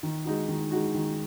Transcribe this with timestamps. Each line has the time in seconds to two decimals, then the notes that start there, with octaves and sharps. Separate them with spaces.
0.03 D#3
0.25 G#3 D#4 F#4
0.49 D#3
0.71 G#3 D#4 F#4
0.94 D#3